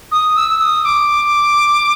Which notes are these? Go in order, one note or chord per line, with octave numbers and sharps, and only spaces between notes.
D#6
E6
D#6
D6